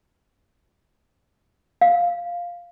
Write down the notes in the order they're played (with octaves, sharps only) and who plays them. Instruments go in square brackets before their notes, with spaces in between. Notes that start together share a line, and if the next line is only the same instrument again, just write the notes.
[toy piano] F5